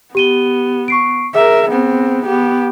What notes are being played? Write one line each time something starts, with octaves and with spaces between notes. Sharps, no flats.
B3 G4 D#7 G7
C#6 C7 D7
G#4 A#4 E5
B3 C4
B3 G4